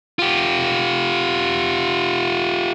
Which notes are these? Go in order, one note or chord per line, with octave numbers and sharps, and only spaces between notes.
F4 G4